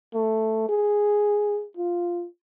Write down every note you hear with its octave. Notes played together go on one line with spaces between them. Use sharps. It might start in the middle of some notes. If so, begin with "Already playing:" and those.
A3
G#4
F4